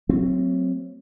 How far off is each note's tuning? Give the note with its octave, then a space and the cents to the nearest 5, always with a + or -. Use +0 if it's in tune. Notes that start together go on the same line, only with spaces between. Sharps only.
F#3 +0 A3 +40 C4 +0